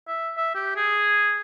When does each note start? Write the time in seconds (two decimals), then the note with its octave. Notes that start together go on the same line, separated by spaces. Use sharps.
0.08 E5
0.37 E5
0.55 G4
0.76 G#4